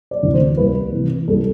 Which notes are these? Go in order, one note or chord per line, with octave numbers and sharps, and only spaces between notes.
D5
D2 C3 E3
C5
C2 B4
C3 E3
C2 A4